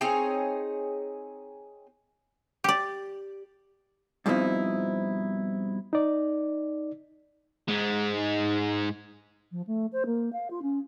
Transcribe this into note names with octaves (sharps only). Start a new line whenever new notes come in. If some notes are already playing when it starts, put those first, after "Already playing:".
C4 D#4 G#4 C#5
G4 D5
G2 B2 F3 C4 D#4 E4
D#4 D5
G#2 G#3
F3
A3
C5
A#3
F5
F4
C#4